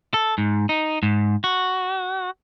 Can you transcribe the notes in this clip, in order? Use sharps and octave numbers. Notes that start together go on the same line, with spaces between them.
A4
G#2
D#4
G#2
F#4